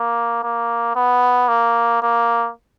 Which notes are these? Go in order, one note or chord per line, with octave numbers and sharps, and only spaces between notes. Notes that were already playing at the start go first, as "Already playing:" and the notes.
Already playing: A#3
A#3
B3
A#3
A#3